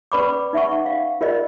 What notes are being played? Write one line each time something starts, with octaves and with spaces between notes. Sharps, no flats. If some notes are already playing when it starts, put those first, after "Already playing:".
C#4 B4 D5 B5 C#6 D6
D#4 E5 F#5 C#6
F5
F4 A#4 D5 D#5